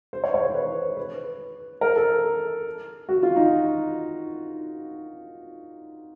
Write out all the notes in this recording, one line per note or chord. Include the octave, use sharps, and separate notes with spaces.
C5
C#5
C#5
C5
B4
B4
A#4
A4
F#4
F4
D#4